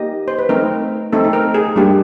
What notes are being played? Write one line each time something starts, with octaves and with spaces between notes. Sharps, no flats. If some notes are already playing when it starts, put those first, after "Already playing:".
Already playing: A#3 D#4 G4 D#5
C5
B4
A3 C4 D#4 A#4
A3 C4 D#4 A4
A4
A#4
G#4
G3 A#3 D4 G4